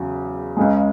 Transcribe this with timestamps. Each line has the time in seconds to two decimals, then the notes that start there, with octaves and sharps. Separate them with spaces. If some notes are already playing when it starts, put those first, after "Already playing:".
Already playing: E2 C#3 F#3
0.57 C#2 C#3 G#3